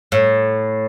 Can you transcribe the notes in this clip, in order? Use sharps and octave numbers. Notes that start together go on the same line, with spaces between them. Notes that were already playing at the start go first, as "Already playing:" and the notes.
A2